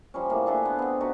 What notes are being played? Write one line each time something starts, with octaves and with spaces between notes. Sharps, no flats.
F3 G3 C#4
A2 C3 F3 A#3
D4 G#4 A4 B4
B3 F#5
B3 C4
D3 D#4 F#4 B4